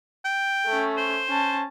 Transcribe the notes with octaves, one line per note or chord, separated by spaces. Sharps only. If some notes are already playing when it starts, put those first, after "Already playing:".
G5
A3 C#4
C5
C#4 A5